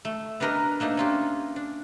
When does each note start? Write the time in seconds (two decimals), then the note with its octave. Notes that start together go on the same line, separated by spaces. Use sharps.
0.05 A3
0.40 B3 D4 G4 A#4 B4 D#5
0.80 A3 A#3 D4 D#4
0.97 C#4 F4 G4
1.56 D4